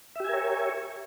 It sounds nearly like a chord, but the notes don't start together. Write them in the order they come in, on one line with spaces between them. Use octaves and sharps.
E5 G4 G#5 A#4 C#5